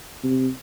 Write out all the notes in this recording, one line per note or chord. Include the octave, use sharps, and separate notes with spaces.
C3